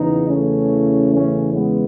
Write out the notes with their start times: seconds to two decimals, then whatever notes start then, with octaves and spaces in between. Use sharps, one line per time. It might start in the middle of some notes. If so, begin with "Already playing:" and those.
Already playing: E2 C#3 E3 B3 D#4
0.29 A3 C#4
1.13 A3 C#4
1.55 G#3 B3